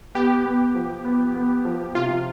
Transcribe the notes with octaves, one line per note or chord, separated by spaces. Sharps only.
B3 G4
B3
F3
B3
B3
F3
C3 F4